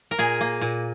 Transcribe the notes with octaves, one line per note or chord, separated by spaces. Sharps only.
A#4
A#2 G#4
A#3
A#2